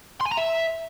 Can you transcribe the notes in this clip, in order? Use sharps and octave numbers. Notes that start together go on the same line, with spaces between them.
C6
G#5
A#5
E5